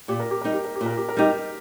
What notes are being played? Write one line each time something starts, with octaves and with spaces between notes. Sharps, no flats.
A#2 G4
A#4
G4
G3 D#4 A#4
G4
A#4
G4
A#2
A#4
G4
A#4
G3 D#4 G4